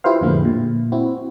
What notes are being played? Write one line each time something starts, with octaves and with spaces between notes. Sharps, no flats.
E4 F4 G4 B4 C5 F5
F2 A2 D3 G#3 A#3
A#2
C4 E4 F#4